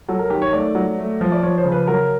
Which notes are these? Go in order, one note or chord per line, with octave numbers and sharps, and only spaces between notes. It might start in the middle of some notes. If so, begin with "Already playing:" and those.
F#3 A4
A#4
D#3 G4
C#5
A3 D5
F#3
A3
F3
D5
F3 C#5
C5
C#3
B4
F#3 A#4